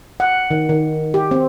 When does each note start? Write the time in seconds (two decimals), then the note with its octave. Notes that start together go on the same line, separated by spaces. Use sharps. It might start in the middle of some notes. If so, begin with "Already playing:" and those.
0.20 F#5
0.51 D#3
0.69 D#3
1.14 G4
1.31 C4